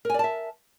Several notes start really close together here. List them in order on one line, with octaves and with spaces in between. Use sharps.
A#4 G#5 D5 A5 E5